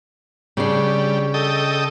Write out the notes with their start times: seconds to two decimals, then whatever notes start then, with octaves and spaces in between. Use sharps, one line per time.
0.57 C#3 G3 D4
1.34 A4 D#5 G5